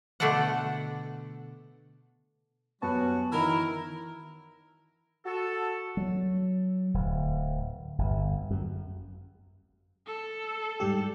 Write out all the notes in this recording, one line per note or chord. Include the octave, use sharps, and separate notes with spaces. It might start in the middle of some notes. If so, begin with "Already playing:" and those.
B2 D3 A3 D4 A4 F#5
F#2 G3 B3 C#4 F#4 A5
D#3 E3 E4 A#4
F#4 A4
F#3
D1
G1
F#2
A4
G#2 G3 G4